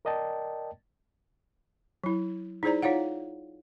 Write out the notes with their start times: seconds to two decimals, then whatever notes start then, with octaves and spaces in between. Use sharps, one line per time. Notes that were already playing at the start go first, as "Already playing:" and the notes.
0.05 A#4 D5 D#5 G5 A5
2.04 F#3 E4
2.63 D#4 E4 G#4 C5 D5 A#5
2.82 D#4 F4 C#5 F5 F#5